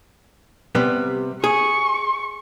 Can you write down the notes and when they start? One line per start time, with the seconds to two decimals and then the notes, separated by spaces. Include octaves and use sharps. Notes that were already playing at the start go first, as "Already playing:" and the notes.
0.75 C3 G3 B3
1.44 G#4 C#6